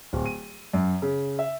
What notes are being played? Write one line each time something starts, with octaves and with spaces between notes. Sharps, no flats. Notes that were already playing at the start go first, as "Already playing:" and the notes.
D1
D#7
F#2
C#3
E5